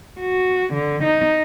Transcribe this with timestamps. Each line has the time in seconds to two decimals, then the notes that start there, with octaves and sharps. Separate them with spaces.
0.20 F#4
0.73 D3
1.03 D#4